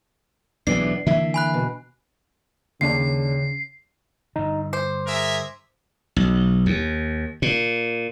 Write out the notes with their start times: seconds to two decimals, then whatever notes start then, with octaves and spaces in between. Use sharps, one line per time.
0.67 B1 E2 A2 E3 B3 D4 C7
1.07 D3 E3 A#3 E5
1.34 G#5 B5 F#6
1.54 B2
2.81 D#2 C#3 D4 C7
4.36 G2 D3 D#4
4.73 C5 D6
5.07 G#4 A#4 E5
6.16 B1
6.66 D#2
7.42 A#2